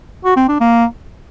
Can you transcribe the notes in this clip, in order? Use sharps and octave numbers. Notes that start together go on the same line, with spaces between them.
F#4
C4
D4
A#3